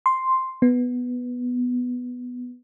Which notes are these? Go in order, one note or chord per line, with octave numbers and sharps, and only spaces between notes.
C6
B3